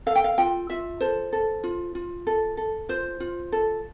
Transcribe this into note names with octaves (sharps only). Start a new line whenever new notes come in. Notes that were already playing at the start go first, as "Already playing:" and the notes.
A4 F5
G5
F5
F4 G5
F4 E5
A4 C5
A4
F4
F4
A4
A4
F4 C5
F4
A4